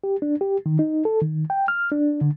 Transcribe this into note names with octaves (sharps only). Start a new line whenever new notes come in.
G4
D4
G4
D#3
D#4
A4
D#3
G5
F6
D4
D3